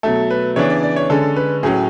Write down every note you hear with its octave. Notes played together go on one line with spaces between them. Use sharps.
B2 F#3 A3 A4
B4
C#3 E3 B3 D4 C#5
D5
D5
C#5
D3 G#3 C#4 A4
B4
A2 F#3 C#4 G#4